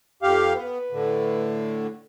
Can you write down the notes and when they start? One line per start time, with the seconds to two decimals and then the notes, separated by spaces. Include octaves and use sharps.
0.22 F2 G4 F5
0.56 B3 B4
0.92 A2 D3